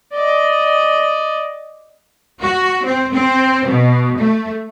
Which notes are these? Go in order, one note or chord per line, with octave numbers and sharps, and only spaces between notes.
D5 D#5
F#4
C4
C4
B2
A3